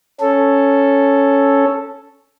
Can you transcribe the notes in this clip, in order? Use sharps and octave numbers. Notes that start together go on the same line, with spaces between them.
C#4 A4